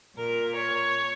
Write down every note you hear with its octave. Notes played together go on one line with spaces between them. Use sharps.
A#2 A#4
C#5